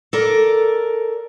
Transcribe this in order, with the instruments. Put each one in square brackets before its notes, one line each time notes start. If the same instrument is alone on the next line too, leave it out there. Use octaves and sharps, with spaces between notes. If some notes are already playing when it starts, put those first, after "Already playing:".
[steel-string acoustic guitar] A4 A#4 D5